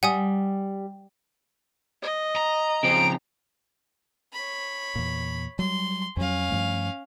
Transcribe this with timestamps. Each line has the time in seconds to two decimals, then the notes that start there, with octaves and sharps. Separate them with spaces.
0.03 G3 F#5 G#5 D#6
2.02 D#5
2.37 A#5
2.83 C#3 F3 C4 D7
4.33 C#5 B5
4.96 E2 A#2
5.59 F#3 G3 C6
6.17 F2 F#3 C#4 F5
6.51 G2 F3 A3